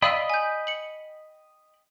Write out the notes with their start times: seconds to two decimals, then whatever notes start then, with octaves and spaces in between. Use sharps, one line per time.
0.02 D5 D#5 F5 G5 B5 E6
0.30 G#5 G6
0.67 C#7 F#7